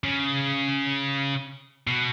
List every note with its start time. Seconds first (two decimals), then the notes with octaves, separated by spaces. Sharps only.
0.04 C#3
1.87 B2